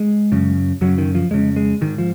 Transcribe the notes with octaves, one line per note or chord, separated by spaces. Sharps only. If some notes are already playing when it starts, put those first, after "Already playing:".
Already playing: G#3
F#2 C#3
F#2 C#3 F#3
D#3
F3
F2 C#3 G#3
G#3
G#2 D#3
F3